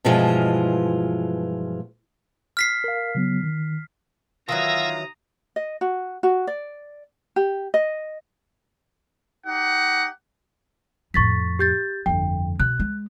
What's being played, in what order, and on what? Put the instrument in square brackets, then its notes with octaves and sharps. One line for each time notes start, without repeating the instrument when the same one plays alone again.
[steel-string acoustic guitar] G2 B2 E3 F3 G#3 F4
[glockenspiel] F6 B6 C7
[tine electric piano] A#4 F5
C#3 F#3 B3
D#3
[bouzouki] D#3 E3 F#3 [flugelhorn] F4 [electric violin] A#5 D#6 [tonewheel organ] E6 A#6
[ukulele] D#5
F#4
F#4
D5
G4
D#5
[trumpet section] D#4 G4 F#5
[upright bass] F2 A2 [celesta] C#6 A6 B6
[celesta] G4 G6 A6
[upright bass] G1 F2 [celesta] G5
[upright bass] B2 [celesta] F#6
[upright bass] G#3